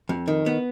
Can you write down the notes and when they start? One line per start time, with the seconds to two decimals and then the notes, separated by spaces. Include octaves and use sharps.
0.09 F2
0.28 D#3
0.46 B3